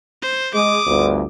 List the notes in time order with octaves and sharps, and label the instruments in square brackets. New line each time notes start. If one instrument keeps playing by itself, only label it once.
[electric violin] C5
[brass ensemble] G#3 [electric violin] D6 D#6
[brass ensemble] G1 D2